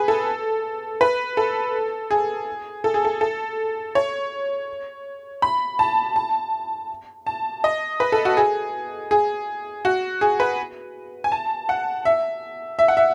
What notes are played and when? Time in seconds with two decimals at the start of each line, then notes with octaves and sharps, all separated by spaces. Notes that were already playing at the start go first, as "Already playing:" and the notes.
Already playing: G#4 B4
0.08 A4
1.01 B4
1.37 A4
2.11 G#4
2.84 A4
2.94 G#4
3.05 A4
3.21 A4
3.95 C#5
5.42 B5
5.79 A5
6.16 A5
7.27 A5
7.64 D#5
8.00 B4
8.12 A4
8.25 F#4
8.37 G#4
9.11 G#4
9.85 F#4
10.21 G#4
10.40 B4
11.24 G#5
11.32 A5
11.69 F#5
12.05 E5
12.79 E5
12.88 F#5
12.97 E5